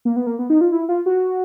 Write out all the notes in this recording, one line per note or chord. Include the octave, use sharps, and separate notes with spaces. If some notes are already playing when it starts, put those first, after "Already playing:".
A#3
B3
A#3
B3
D#4
F4
E4
F4
F#4